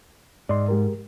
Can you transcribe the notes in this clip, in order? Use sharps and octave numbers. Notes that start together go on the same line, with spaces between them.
G#2 D5 D#5 C6
G#3 G4 A#4